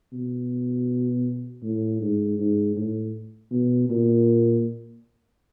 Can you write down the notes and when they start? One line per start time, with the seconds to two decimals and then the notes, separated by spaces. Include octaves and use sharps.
0.13 B2
1.63 A2
2.01 G#2
2.39 G#2
2.77 A2
3.51 B2
3.90 A#2